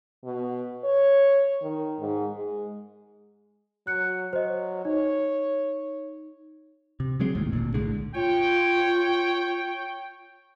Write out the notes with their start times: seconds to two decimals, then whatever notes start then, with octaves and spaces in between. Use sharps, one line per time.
0.24 B2
0.84 C#5
1.62 D#3
2.00 G#2
2.34 G#3
3.87 F#3 F#6 C#7
4.33 F#3 C5 D#5
4.85 D#4 C#5
7.00 C3
7.20 C#3 F#3 G#3 C4
7.35 G#1 D#2 A2
7.53 D1 D2 A#2
7.74 B1 A2 D3 G#3
8.15 F4 C#5 G5